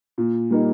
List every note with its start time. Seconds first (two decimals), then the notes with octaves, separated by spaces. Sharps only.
0.18 A#2
0.51 G3 A#3 D#4